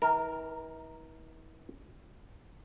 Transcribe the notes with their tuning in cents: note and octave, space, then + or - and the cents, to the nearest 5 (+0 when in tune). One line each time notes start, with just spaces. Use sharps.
E3 -45 A#4 +0 A#5 -40